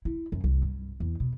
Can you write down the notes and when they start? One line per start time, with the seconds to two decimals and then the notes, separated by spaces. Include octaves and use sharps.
0.05 E4
0.32 F#2
0.44 C2
0.62 G2
1.00 E2
1.20 B2